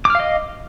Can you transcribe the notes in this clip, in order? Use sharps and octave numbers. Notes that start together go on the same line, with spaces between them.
D#5 F5 D6 F6